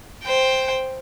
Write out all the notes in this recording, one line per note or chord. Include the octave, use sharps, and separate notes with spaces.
C5 G5